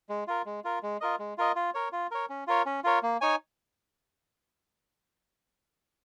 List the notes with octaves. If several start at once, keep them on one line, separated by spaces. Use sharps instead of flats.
G#3
F4 A#4
G#3
F4 A#4
G#3
F4 A#4 D#5
G#3
F4 A#4 D#5
F4
A#4 C#5
F4
A#4 C#5
C#4
F4 A#4 C#5
C#4
F4 A#4 C#5
A#3
D#4 C#5 G#5